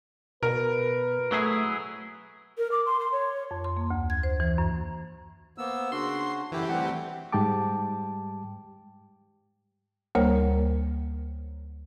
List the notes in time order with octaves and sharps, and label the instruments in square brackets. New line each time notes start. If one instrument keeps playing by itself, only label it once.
[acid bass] B2 [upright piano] A#4 [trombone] B4
[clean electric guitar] F#3 E4 G#4 [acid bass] A3
[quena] A#4
D6
C6
C6
C#5
[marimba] F2
C6
A#3
D2
G#6
C5
E3
F#2
[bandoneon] A#3 B3 E6 [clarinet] C5
[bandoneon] C#3 F#4 [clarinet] D4 [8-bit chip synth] C6
[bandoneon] F#2 D3 E4 [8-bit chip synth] E3 G4
[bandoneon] G3 A3 C4 [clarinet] F#5
[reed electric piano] G#2 G3 G4 G5 A5 D6
[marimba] D2 G3 A#3 A#4 C5 C#5